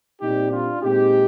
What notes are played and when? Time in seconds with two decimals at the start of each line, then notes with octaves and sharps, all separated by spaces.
0.20 A#2 G3 C4 D#4 G4
0.51 D4 F4
0.81 A#2 G#3 C4 D#4 G4